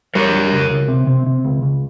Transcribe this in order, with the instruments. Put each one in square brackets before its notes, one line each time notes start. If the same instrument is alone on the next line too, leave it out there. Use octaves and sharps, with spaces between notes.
[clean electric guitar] G3 [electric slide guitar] A#4 C#5
[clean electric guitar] G3
C#2
C#2
C3
C3
C3
C#2
C#2